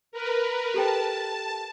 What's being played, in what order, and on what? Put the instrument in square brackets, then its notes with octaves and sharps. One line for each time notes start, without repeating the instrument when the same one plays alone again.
[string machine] A#4 B4
[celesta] G4 A4 G5 [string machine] A5